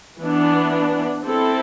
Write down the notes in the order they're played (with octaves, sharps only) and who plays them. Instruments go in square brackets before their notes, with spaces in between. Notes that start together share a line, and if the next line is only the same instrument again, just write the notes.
[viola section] E3 B3 D4
C4 E4 A4